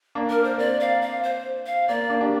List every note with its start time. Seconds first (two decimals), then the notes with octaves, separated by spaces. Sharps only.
0.15 A#3 D4
0.30 A#4
0.44 C5
0.59 C4 D5
0.80 F5
1.02 F5
1.23 C5
1.66 F5
1.88 A#3 D5
2.09 A#3 D4
2.21 D4 G4